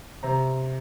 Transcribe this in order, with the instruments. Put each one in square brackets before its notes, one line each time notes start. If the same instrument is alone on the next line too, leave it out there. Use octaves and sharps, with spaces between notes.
[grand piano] C3 A#5